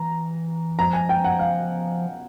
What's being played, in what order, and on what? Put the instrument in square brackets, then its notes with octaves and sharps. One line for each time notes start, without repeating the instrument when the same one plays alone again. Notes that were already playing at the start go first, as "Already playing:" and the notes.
Already playing: [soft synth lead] E3 [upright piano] A#5
[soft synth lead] F3 [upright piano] A#5
[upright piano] G#5
G5
F#5
F5